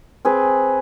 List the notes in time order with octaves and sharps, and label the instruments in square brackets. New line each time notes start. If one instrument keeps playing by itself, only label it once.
[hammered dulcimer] C4 G#4 B4